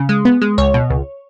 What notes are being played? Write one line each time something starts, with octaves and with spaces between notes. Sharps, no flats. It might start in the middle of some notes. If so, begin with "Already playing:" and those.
Already playing: C#3
G#3
B3
G#3
C#2 C#5
B2
C#2